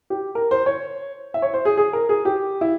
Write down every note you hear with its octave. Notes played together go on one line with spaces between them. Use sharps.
G4
A#4
C5
C#5
E5
C#5
C5
G#4
G#4
A#4
G#4
G4
E4